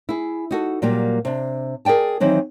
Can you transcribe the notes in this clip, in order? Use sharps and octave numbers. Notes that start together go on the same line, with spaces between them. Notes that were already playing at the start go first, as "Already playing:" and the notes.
E4 G#4
D#4 F#4 A4
A#2 F#3 G3 A#3
C3 D4
G#4 A#4 D5 G5 A5
D#3 E3 F#3 C4 E4